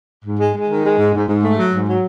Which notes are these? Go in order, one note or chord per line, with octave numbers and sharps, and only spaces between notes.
G#2
G#3
G#3
D#3
G#3
G#2
G#2
G#2
A3
F#3
G#2
F#3